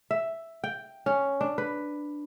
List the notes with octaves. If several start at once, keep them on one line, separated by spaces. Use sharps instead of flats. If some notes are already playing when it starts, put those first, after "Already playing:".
E5
G5
C#4
D4
B4